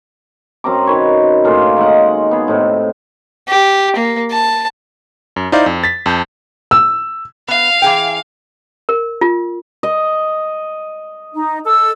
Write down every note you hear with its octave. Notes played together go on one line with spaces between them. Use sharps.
F#2 C4 A#5 D6
D#3 B4 C#5
A2 A#3 F4 G#4
D#3 G#3 D#5 F#5
B3 G#4
A2 C3
G4
A#3
A5
F#2
D#4 E4 C5 D5 F5
F2
A6 B6
F2 A5 G6
E6
B3 F5
E3 G#4 G5
A#4
F4
D#5
D#4
A4 E6